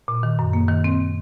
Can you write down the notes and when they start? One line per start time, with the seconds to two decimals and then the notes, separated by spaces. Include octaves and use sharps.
0.08 A#2
0.23 D#3
0.39 F#2
0.53 A#3
0.69 D#3
0.84 C4